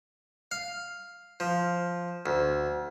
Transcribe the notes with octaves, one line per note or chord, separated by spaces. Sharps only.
F5
F3
D2